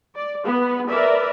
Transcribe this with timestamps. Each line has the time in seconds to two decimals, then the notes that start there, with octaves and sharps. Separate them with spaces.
0.16 D5
0.44 B3 B4
0.88 A#4 B4 D5 E5